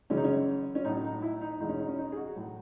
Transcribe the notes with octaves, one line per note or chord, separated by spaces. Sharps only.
F#2 C#3 E3 G#3 C#4
D#4
C#4
C#4
A2 F#3 D#4
D#4
E4
D#4
E2 B2 G#3 D#4
C#4
D#4
C#4
D#4
G#4
F#4
A2 F#3